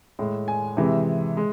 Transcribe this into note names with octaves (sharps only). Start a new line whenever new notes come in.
A2 G#3
G#5
C3 E3 G#3
G#3